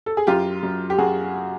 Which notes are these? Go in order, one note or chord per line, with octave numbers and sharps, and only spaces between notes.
A4
G#4
F#2 F4 G4
F#2
G4
F#2 F#4 G#4